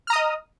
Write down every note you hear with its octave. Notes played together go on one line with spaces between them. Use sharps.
D#5 A#5 D#6 F6